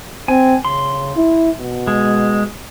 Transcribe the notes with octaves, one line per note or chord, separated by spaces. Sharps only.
C4 G#5
C#3 C6
E4
B2
G#3